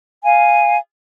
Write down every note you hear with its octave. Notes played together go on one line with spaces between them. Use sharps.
F5 G#5